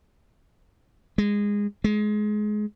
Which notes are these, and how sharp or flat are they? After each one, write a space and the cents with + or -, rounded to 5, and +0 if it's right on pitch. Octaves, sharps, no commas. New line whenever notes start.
G#3 -20
G#3 +20